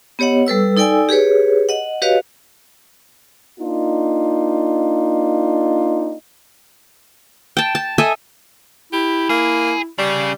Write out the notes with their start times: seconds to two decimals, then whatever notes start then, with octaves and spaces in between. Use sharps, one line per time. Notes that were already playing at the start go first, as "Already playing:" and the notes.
0.19 B3 G4 C#5 D#5 F#5
0.47 G3 A4 B4 E6
0.77 D#4 A4 D5 G5 G#5 E6
1.09 G4 G#4 B4 C#5
1.69 D#5 F#5
2.02 F#4 G4 B4 C#5 D#5 F5
3.60 A#3 D4 D#4 F4
7.57 G5 A5
7.75 A5
7.98 A4 D#5 E5 G#5
8.93 E4 G4
9.29 A#3 G#4
9.98 C#3 G3